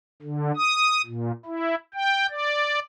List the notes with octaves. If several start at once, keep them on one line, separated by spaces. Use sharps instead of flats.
D3
D#6
A#2
E4
G5
D5